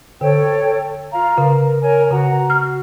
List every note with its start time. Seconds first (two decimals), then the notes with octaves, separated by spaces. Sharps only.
0.21 D3 A4 C#5 G5
1.13 F4 F5 A#5
1.38 C#3 A#4
1.81 A#4 C#5 G#5
2.11 C#3 F#4 F#5 A#5
2.50 F#4 F6